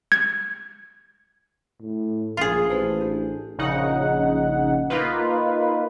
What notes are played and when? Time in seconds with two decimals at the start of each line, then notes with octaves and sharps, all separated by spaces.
0.12 G#6
1.81 A2
2.37 A#1 F4 G#4 A#4
2.70 A1 B4 C5 A5
3.01 D4
3.58 A#1 C#3 D#4 F#5
4.90 A#3 D#4 F4 B4